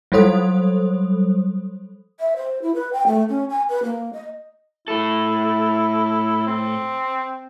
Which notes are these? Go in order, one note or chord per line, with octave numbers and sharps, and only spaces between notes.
F#3 G3 A4 C5 D#6
E5
C5
E4
B4
G5
A3
C#4
G#5
B4
A#3
D#5
A2 E4 A4
C4